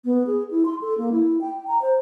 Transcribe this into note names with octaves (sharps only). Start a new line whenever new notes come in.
B3
G#4
E4
C6
A4
A#3
E4
G5
A#5
C5